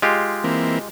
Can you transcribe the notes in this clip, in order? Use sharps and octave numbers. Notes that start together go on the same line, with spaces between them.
G#3 F4 G4
E3 A#3 C4